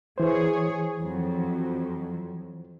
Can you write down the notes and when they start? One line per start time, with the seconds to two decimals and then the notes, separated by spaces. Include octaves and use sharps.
0.18 E3 G#4 C5 C#5
0.99 F2 F#3